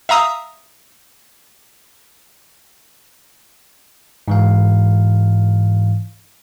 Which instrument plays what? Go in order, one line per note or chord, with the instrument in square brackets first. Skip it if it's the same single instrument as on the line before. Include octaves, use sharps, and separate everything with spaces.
[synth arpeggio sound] E5 F5 A#5 D#6 E6
[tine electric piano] G#2 E3 F5